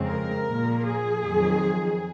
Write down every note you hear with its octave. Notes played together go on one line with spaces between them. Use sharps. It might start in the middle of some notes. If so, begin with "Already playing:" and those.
Already playing: F2 C#3 G#3 C4
A#4
A#2 F3 A#3
G#4
F2 D#3 F#3